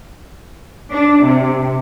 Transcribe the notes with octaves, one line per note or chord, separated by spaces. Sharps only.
D4
C3